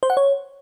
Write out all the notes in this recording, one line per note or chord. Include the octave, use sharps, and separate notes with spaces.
C5
F#5
C#5